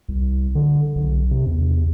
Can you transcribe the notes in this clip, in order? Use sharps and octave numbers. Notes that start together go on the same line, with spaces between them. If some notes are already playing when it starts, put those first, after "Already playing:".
C2
D3
B1
C3
E2